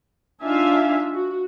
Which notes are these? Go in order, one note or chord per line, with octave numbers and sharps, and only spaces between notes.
D4 D#4 F4 E5 F5 G#5
F#4